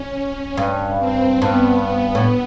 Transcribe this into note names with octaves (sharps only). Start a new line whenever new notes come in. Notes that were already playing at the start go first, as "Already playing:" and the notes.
Already playing: C#4
G2
C4
G2 B3
B3
A2